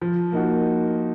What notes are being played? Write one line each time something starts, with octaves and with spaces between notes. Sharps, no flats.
F3
A#3 D#4 F#4